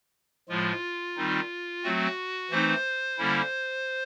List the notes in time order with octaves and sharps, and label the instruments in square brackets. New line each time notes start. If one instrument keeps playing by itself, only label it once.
[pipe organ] A2 F3 G#3 F4
D#3 G3 C4 D#4
F#3 A3 C4 F#4
E3 A3 C4 D#4 C5
D3 G3 A#3 C#4 E4